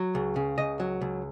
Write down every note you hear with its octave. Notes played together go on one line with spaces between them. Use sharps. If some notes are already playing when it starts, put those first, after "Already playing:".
Already playing: F#3
C#2
C#3
C#2 D#5
F#3
C#2